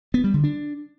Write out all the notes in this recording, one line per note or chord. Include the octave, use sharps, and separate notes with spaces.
B3
G3
D3
D4